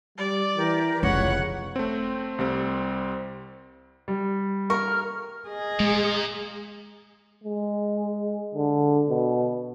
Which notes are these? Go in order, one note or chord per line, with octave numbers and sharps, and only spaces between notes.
G3 D5
E3 G4 A#4
F1 C#2 C#5 F#5 B5 F#6
A3 C4
C2 G3 C4
G3
A#4 C#6 F6
G#4 D#5
A#2 G#3
G#3
D3
B2